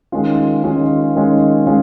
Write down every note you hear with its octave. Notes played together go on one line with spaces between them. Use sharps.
D#3 G#3 C#4 F4
D#3 G#3 C#4 F4
D#3 G#3 C#4 F4
G#3 C#4 F4